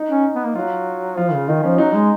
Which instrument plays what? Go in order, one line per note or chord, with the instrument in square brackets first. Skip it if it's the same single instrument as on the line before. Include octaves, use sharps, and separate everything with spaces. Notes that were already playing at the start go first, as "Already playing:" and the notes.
Already playing: [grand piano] D#4
[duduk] C#4
B3
A#3
[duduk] F#3 [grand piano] F4
[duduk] F3 [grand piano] F4
[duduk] C#3
[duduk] D#3 [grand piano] D#4
[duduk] F3 [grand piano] C#4
[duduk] F#3 [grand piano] D#4
[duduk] G#3